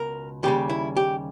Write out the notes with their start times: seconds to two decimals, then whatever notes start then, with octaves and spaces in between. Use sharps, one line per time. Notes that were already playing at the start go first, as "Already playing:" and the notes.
Already playing: C#2 B2 A#4
0.43 D#2 C#3 G3 G4
0.69 E4
0.97 G4